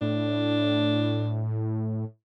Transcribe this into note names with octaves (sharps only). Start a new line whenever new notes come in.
A2 D4